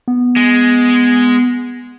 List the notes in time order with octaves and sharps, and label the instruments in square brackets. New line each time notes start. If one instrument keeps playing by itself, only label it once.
[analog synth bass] B3
[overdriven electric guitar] G#3